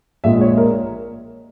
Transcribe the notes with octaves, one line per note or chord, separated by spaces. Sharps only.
A#1 A#2 G#3 E5
C#5
A#4